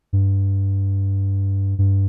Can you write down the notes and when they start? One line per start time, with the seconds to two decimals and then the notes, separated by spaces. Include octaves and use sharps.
0.13 G2
1.78 G2